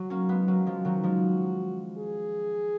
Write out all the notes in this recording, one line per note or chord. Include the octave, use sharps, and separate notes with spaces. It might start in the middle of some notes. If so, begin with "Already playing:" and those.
Already playing: F#3 F#4
A#3 C#4
G#3 B3
F#3 A#3 F#4
F3 G#3
D#3 F#3
F3 G#3
G#4